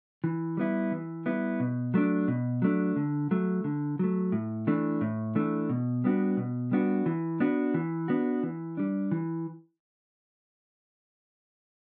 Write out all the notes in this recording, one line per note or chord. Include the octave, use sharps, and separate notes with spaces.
E3
G3 B3 E4
E3
G3 B3 E4
B2
F#3 A3 D4
B2
F#3 A3 D4
D3
F#3 A3
D3
F#3 A3
A2
E3 A3 D4
A2
E3 A3 D4
B2
G3 B3 D4 F#4
B2
G3 B3 D4 F#4
E3
B3 D4 F#4
E3
B3 D4 F#4
E3
G3 D4
E3